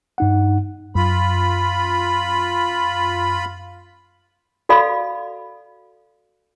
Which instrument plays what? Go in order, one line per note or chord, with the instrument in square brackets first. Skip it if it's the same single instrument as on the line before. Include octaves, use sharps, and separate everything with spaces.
[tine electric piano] G2 D#4 F#5
[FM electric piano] F#2 [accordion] F4 B5
[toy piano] F#4 A4 D5 F5 B5